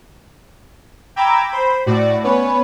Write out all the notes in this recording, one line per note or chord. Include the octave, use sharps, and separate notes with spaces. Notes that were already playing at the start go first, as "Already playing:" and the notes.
G5 A#5 B5 D6 E6 G#6
C5 B5
A2 F#4 D5
B3 C#4 B4 C#5